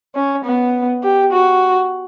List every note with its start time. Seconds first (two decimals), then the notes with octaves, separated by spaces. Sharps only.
0.15 C#4
0.45 B3
1.03 G4
1.32 F#4